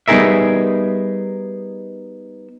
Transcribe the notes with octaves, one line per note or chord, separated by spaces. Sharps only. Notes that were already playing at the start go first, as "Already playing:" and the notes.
G3 B3 D#4 G#4 A#4 E5